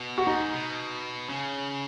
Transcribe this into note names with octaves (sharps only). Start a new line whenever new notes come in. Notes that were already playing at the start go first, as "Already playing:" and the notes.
Already playing: B2
F#4
G#2 D#4
B2
C#3